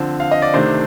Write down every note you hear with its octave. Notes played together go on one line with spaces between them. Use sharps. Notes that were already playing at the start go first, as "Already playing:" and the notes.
Already playing: D3 F3 C4
F5
D#5
D5
C3 D#3 A3 D4 C5